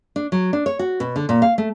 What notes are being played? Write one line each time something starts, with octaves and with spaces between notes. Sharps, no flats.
D4
F#3
D4
C#5
F#4
B2
D3
A#2
F5
A3